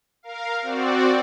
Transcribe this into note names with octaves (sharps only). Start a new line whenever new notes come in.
A#4 F5
C4 F#4 D5